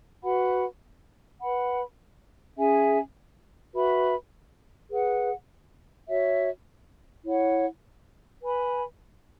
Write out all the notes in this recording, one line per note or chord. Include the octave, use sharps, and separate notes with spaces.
F#4 B4 F#5 B5
B4 F#5 B5
C#4 G#4 E5 G#5
F#4 B4 E5 B5
G#4 B4 F#5
F#4 C#5 E5
E4 C#5 F#5
B4 G#5 B5